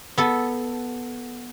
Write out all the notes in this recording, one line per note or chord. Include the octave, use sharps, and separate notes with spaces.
B3 A4